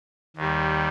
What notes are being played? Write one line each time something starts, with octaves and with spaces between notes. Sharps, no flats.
D#2 D#3 G3